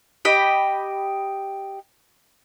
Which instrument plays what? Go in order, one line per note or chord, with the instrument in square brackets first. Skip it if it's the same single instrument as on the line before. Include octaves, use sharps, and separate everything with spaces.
[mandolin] G4 D#5 B5